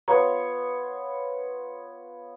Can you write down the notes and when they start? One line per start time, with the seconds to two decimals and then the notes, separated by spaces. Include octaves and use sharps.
0.08 B3 F4 C#5 A#5